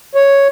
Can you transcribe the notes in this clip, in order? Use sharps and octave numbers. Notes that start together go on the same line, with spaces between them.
C#5